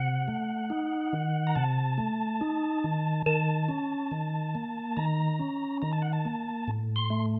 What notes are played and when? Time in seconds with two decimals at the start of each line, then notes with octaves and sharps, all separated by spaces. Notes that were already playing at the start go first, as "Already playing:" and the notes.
Already playing: C3 F#5
0.28 A3
0.70 D#4
1.13 D#3
1.47 A#5
1.55 C3 A5
1.98 A3
2.41 D#4
2.84 D#3
3.26 D#3 A5
3.69 C#4
4.11 D#3
4.55 A#3
4.97 D#3 A#5
5.39 C#4
5.82 D#3 A#5
5.93 A5
6.02 F#5
6.13 A5
6.25 A#3
6.68 A2
6.96 C6
7.10 A3